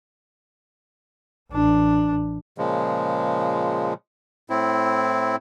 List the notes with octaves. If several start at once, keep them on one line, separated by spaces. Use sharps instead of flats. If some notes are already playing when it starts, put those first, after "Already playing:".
A1 D4
A#2 C#3 F3 G#3
A2 C4 E4